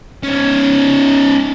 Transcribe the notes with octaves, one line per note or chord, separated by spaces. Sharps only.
C#4 D#4